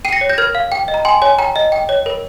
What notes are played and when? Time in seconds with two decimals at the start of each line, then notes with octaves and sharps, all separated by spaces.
0.05 G5 C7 D#7
0.12 A#6 C#7
0.21 C#5
0.30 G6 A#6
0.38 A#4 F6 G#6
0.55 F5
0.72 G5
0.88 D#5
0.94 A#5
1.05 G5 G#5 C6
1.22 C#5 G#5
1.39 G5 A#5
1.56 D#5
1.72 G5
1.89 C#5
2.06 A#4